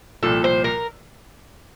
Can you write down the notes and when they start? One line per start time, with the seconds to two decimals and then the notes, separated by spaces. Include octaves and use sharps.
0.23 C2 A#2 F3 A4
0.44 C5
0.64 A#4